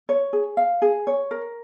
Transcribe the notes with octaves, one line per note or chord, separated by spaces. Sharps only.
C#5
G#4
F5
G#4
C#5
A#4